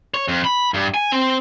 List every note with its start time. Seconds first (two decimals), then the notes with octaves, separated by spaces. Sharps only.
0.14 C#5
0.28 F2
0.45 B5
0.74 G2
0.94 G#5
1.12 C4